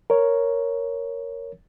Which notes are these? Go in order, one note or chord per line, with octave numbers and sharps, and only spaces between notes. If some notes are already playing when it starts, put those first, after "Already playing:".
A#4 C#5